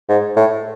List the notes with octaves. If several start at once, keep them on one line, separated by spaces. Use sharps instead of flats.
G#2
A2